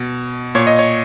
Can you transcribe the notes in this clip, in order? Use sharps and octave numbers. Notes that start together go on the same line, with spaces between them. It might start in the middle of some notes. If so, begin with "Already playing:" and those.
Already playing: B2
A#2 C#5
D#5
C#5